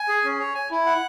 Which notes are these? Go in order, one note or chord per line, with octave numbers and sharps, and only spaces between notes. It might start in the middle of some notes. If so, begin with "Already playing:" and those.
Already playing: G#5
G#4
C#4
C#5
G#5
E4
F#5